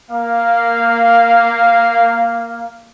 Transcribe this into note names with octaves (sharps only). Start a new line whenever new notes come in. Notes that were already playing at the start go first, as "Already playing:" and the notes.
A#3 F5